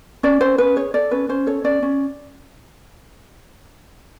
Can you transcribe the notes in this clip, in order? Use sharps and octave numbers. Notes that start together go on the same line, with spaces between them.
C#4 D5
C#4 C5
C#4 B4
G#4 C#5
A4 D5
C#4 B4
C#4 C5
A4 C#5
C#4 D5
C#4